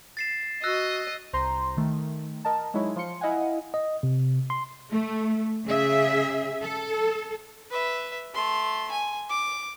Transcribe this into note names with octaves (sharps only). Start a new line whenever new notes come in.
A6 C7 E7
F#4 D#5 E6 F#6 A#6
C2 C5 A#5 C6
D#3 A3
A#4 D#5 A5
F#3 G#3 D#4 E4 C#5
F3 F4 C6 C#7
E4 D#5 F5 F#5 G#5
D#5
C3
C6
A3
C#3 G#4 E5
A4
B4 E5
A3 C6
G#5
D6